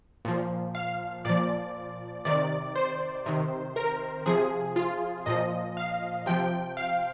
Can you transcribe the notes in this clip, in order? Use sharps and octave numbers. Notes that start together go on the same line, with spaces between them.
A#2 F3
F5
A#2 F3 D5
C3 D#3 D5
C5
C3 D#3
A#4
C3 F3 G#4
F4
A#2 F3 D#5
F5
C3 F3 G5
F5